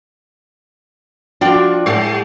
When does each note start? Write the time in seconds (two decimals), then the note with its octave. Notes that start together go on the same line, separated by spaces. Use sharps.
1.41 F3 D4 F4 F#4 D5 G5
1.86 A2 G3